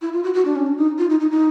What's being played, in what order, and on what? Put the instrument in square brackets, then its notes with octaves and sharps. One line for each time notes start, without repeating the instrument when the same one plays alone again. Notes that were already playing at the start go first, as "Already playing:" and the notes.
[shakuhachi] E4
F4
F#4
F#4
D4
C#4
D4
D#4
F4
D#4
D#4
D#4